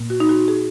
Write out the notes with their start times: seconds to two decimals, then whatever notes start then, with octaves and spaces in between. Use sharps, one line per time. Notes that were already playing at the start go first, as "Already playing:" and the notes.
Already playing: A#2 A#3
0.10 F#4
0.20 D#4
0.29 F#4
0.48 G#4